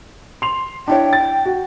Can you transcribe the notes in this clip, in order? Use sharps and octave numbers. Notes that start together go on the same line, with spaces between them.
C6 F7
D4 E4 C#5 G5
A6
F#4